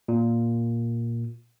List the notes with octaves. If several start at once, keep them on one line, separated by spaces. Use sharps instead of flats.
A#2